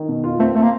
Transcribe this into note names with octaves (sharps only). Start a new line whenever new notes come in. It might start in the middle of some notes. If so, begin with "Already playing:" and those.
Already playing: D#3
B2
F4
A3 C4
A3 C4
A#3